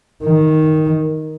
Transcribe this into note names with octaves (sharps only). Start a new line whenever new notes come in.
D#3